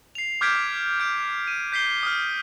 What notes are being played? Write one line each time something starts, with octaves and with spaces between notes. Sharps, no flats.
C7 F7
D6 F6 G6 G#6 B6 D7
G6 D7
D#7
G6 B6 C7 G7
D#6 F6